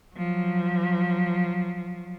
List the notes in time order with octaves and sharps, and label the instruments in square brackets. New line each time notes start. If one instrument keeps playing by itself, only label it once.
[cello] F3 F#3